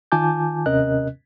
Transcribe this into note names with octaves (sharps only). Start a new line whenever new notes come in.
D#3 F4 G#5 A5 D6 G6
D#2 C3 C#4 A#4 D#5 F#6